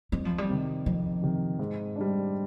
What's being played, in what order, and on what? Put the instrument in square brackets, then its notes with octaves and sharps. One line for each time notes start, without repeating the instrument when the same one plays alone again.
[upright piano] F2 [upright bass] G3
[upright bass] F3
G3
[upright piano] C3 D#3
[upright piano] F2 [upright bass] F3
[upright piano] C3 D#3
G#2
G3 D4